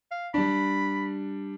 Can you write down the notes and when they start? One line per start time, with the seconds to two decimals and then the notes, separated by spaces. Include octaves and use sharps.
0.11 F5
0.34 G3 D4 B5